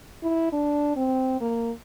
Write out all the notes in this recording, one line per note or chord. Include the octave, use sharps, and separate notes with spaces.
E4
D4
C4
A#3